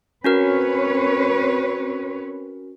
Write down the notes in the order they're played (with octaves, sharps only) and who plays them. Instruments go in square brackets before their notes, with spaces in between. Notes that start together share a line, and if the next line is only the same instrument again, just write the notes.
[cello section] C4 B4 C#5 [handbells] C#4 F#4 A#4